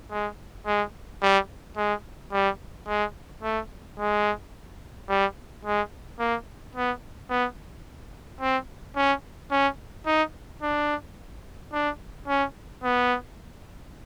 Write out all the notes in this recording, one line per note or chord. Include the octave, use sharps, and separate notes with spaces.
G#3
G#3
G3
G#3
G3
G#3
A3
G#3
G3
G#3
A#3
B3
B3
C4
C#4
C#4
D#4
D4
D4
C#4
B3